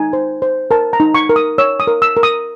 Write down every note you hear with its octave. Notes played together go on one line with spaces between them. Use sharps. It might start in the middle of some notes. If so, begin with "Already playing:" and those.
Already playing: D#4 G#5
C5
C5
A#4 A5
A#5
D#4
C#6
A#4
D#6
C#5 E6
D#6
A#4
E6
A#4
D#6